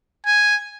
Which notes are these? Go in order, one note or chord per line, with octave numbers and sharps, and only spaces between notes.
G#5